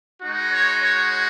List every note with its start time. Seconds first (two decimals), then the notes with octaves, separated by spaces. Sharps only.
0.23 G#3 D#4 F#4
0.52 C#5
0.82 C#5